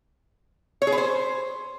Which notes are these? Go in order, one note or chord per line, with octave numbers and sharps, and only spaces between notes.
C#5
G#4
B4
C5